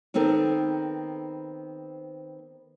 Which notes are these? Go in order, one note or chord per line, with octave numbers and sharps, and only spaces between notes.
D#3 B3 C4 A4 A#4